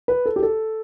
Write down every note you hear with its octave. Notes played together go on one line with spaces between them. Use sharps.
B4
A4
G4
A4